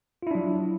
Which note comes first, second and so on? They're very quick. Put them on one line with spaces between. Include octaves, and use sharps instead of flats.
F4 E4 D4 F#3